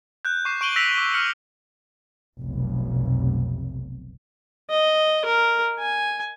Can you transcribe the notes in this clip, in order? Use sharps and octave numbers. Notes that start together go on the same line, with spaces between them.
F#6 G6
C#6 D6 C7 E7
C#6 D7 D#7 F#7 G7
E6 A#6 B6 D7 F7 F#7
D6
F6 C#7 F#7
F1 B1
D#5
A#4
G#5